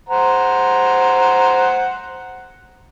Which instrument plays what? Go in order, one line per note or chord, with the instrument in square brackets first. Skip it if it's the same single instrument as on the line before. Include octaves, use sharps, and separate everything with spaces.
[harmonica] C5 F#5 A#5